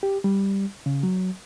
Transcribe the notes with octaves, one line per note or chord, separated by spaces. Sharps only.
G4
G3
C#3
F#3